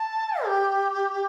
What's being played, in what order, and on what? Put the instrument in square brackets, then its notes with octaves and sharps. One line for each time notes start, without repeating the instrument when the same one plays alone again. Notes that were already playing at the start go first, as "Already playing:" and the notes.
Already playing: [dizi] A5
G4